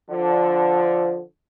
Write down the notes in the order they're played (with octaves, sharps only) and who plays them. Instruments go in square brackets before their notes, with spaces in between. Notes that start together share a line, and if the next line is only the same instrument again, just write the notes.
[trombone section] D3 [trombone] F3